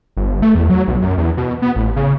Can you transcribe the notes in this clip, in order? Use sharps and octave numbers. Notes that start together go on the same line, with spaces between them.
G1
A3
E2
F#3
B1
F#2
E2
B2
B3
A1
C#3